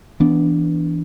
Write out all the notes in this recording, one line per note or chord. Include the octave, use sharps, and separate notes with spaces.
E3 B3 D4